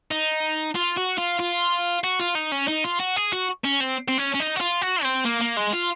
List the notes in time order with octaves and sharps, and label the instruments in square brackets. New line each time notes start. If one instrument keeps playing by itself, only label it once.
[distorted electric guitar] D#4
F4
F#4
F4
F4
F#4
F4
D#4
C#4
D#4
F4
F#4
G#4
F#4
C#4
C4
C4
C#4
C#4
D#4
F#4
F4
F#4
C4
A#3
A#3
G#3
F4